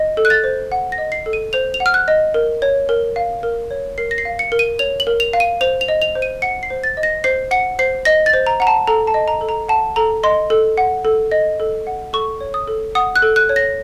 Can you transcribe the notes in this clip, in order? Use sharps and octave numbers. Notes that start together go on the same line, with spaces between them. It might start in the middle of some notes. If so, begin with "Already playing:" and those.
Already playing: D#5
A4
F#6
A6
C5
F#5
A#6
D#5
C7
A4
D#7
C5 F7
F7
F#5
F6
F#6
D#5
A#4
C#5
A#4
F5
A#4
C#5
A#4 C7
A#6
C7
F5
C#7
A#4
D#7
C#5 F7
F#7
A#4
F7
F5
D#7
C5 F7
F7
D#5
F7
C5
D#7
F#5 C#7
C7
C5
A6
D#5
A#6
C5 C7
F#5 C#7
C5 C7
D#5 A#6
A6
C5
A#5
F#5 A#5
A5
A4 A#5
A5
D#5
A#5
A4
A#5
F#5 A5
A4 A#5
D#5 C6
A4
F#5
A4
D#5
A4
F#5
A4 C#6
C#5
D#6
A4
F#5 D#6
F#6
A4
F#6
C#5
A#6